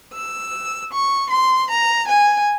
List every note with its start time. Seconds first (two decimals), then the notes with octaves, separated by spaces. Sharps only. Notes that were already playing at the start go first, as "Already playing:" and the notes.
0.13 E6
0.91 C#6
1.30 C6
1.69 A#5
2.06 G#5